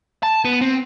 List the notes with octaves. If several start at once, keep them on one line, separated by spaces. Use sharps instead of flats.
A5
B3
C4